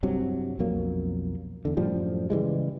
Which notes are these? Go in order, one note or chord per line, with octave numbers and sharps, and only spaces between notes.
C2 G2 C3 F#3
B1 F2 F#3 A#3
E2 D3
F#2 A2 F3 G3
C#3 E3 G3 G#3